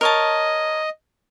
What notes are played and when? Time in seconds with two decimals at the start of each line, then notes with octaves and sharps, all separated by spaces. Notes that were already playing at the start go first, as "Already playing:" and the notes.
0.01 A#4 C#5 D#5 A5